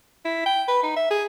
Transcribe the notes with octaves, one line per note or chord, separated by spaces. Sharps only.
E4
G5
B4
D#4
E5
G#4